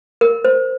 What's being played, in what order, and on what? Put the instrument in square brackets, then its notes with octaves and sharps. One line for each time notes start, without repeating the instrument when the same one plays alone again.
[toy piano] A#4
C5